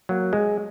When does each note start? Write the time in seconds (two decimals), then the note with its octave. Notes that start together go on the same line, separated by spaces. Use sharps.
0.09 F#3 A#3
0.33 G#3